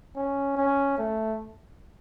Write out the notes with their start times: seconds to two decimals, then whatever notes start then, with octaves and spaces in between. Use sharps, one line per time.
0.16 C#4
0.56 C#4
0.98 A3